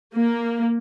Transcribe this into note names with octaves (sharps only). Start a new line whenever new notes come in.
A#3